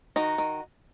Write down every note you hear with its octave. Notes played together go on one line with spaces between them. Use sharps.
D#3 D#4 F#4
D#3